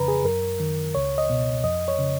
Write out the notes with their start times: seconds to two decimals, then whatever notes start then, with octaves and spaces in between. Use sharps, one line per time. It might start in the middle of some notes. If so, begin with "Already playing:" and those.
Already playing: F2 C#3 B4 A#5 B5
0.08 G#4
0.25 F#2 A#4
0.60 D#3
0.95 C#2 C#5
1.18 D#5
1.30 B2
1.64 F2 D#5
1.88 C#5
1.98 C#3